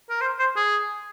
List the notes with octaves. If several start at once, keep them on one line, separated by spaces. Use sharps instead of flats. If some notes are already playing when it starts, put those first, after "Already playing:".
A#4
C5
C5
G#4